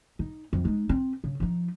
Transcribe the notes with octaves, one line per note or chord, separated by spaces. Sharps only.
D#4
F2
G#3 D#4
C4
C#3
F3 D#4